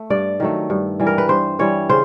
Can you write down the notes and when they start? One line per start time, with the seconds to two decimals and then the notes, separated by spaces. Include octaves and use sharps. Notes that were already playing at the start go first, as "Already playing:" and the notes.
Already playing: A3
0.10 G2 D5
0.40 D#3 F#3 A3
0.70 G2
1.00 E3 G3
1.07 A#4
1.18 B4
1.29 G2 C5
1.59 E3 G3 C#5
1.89 C#3 C5